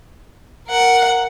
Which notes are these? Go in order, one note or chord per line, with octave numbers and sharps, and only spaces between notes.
A#4 F#5